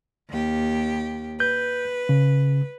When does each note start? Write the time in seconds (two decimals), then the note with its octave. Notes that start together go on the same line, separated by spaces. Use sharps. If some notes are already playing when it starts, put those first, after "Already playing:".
0.29 D#2 G4
1.40 B4 G6
2.09 C#3